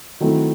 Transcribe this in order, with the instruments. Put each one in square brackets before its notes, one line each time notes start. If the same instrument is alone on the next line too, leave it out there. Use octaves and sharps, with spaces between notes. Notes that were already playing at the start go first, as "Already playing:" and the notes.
[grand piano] D#3 F#3 A3 C4 E4